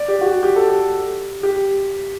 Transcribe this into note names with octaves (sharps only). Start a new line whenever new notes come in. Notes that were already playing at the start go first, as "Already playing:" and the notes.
Already playing: D5
G4
F#4
G4
G4
A4
G4
G4